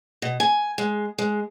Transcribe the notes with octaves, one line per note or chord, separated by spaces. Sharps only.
B2
G#5
G#3
G#3